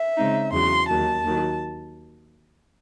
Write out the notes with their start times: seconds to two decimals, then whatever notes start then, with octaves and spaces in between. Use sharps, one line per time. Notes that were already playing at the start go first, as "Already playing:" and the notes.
Already playing: E5
0.17 C#3 G#3 C4 D#4
0.52 E2 C#3 F#3 C6
0.88 D#2 D#3 F#3 A5
1.24 D#2 D#3 F#3